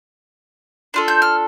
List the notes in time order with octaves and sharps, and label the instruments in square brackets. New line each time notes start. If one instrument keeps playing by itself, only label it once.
[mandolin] D4 F4 A4
G6
F6